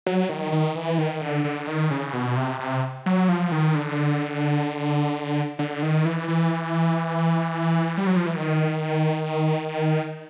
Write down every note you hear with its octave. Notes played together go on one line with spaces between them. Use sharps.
F#3
D#3
D#3
E3
D#3
D3
D3
D#3
C#3
B2
C3
C3
F#3
F3
D#3
D3
D3
D#3
E3
E3
G3
F#3
F3
E3
D#3